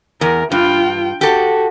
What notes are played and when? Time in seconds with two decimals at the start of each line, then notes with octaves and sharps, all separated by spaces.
0.21 E2 A#4
0.52 G2 F4 G5
1.21 F#4 G4 A4